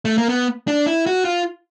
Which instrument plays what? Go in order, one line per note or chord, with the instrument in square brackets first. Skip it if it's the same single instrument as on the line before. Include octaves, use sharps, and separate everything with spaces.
[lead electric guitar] A3
A#3
B3
D4
E4
F#4
F4